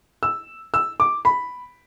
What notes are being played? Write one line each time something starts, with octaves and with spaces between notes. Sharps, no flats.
E6
E6
D6
B5